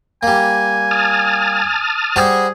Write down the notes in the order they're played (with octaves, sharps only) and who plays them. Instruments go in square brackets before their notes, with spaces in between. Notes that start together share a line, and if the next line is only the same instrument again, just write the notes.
[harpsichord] G3 A#3 [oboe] G#5
[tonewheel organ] A5 D#6 F6
[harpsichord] G3 F#4 C5 [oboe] G#4